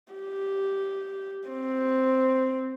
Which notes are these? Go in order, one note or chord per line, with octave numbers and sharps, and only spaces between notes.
G4
C4